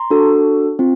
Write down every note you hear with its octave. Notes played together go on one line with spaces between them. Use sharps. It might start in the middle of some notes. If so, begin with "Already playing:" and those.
Already playing: A#5 C6
D4 F#4 A4
C4 F4